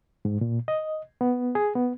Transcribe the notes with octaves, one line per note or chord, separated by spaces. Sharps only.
G#2
A#2
D#5
B3
G#4
B3